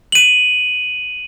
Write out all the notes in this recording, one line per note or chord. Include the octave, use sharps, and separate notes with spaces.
D#7 F#7